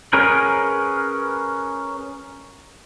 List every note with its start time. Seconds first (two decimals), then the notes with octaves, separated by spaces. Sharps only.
0.13 C#4 G#4 A#4 B4